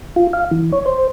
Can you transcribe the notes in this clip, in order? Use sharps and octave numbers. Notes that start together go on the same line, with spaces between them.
F4
F5
E3
C#5
C5